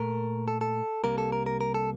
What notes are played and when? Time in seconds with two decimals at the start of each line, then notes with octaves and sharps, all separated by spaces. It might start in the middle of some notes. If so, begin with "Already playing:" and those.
Already playing: A#2 A3 A#4
0.48 A4
0.61 A4
1.04 C2 C3 G3 A#3 A#4
1.18 A4
1.32 A#4
1.46 A#4
1.61 A#4
1.74 A4